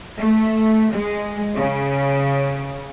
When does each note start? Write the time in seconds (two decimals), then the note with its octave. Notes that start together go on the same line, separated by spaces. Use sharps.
0.17 A3
0.95 G#3
1.56 C#3